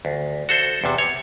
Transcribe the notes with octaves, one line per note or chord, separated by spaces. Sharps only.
D2
F#4 A4 C5
E2 C3
C#5